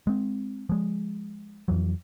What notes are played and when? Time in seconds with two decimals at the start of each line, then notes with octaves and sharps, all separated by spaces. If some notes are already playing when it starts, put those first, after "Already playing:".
0.07 G#3 C4
0.69 F3 G#3
1.68 F2 E3 F#3